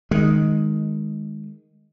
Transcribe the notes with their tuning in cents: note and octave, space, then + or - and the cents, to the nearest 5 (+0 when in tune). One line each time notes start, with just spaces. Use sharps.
D#3 +0 G#3 +5